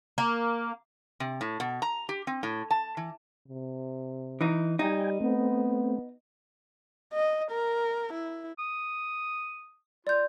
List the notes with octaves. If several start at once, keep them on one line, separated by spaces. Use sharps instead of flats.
A#3
C3
A2
B2
A#5
G4
C4
A2
A5
E3
C3
E3 D#4
G3 D#4 G5 G#5
A3 B3 C4
D#5
A#4
E4
D#6
F4 D5 G6